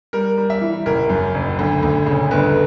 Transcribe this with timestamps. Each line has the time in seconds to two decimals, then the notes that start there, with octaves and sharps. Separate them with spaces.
0.13 G3 A#4
0.37 G3
0.50 E5
0.61 E3
0.86 F#1 A#4
1.09 F#2
1.34 F#1
1.59 D2
1.83 D2
2.06 C#3
2.31 G1 B4